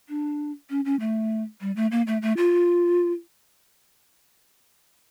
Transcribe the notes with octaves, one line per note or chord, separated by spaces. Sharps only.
D4
C#4
C#4
A3
G3
A3
A#3
A3
A3
F4